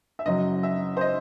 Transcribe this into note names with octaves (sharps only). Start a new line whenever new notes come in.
E5
F#1 F#2 F#3 D#5
E5
C5
D#5